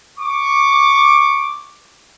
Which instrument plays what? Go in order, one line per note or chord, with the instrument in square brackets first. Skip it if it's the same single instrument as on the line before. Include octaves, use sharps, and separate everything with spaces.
[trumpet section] C#6 D6